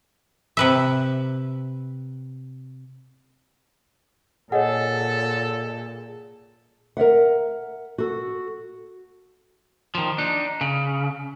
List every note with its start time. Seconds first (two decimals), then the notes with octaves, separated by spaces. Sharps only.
0.57 C3 B4 E5
4.52 A#2 G#4 A4 C#5 D#5 F#5
6.97 A#4 D5 E5 F#5
7.98 F#4 A4
9.95 D#3 F3
10.18 D4 D#4
10.61 C#3